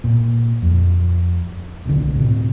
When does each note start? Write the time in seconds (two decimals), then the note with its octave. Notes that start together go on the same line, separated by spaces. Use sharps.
0.04 A#2
0.62 F2
1.85 D1 C2 D3
2.16 A2 C3